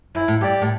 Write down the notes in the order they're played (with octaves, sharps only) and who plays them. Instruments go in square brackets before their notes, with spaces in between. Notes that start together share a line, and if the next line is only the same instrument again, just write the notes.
[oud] F#2 [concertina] E4
[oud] A2
[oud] G2 [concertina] G4 D5
[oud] A2